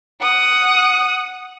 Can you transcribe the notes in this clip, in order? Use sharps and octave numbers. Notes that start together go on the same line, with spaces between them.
F#5 D#6